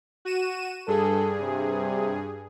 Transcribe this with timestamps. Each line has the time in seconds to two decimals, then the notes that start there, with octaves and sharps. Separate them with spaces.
0.25 F#4 D#7 E7
0.88 G2 G#4 A4
1.42 C3